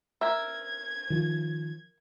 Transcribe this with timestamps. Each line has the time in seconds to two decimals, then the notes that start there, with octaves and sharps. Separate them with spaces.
0.21 A#4 E5 G#6
1.10 D#3 F3